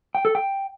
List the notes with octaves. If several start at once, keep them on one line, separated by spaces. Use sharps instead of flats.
G5
A4
G5